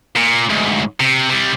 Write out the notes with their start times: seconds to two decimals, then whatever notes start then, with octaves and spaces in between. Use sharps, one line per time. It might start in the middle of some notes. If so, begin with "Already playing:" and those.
0.16 A#2
0.50 D2 G#2
1.00 C3
1.30 C3 G3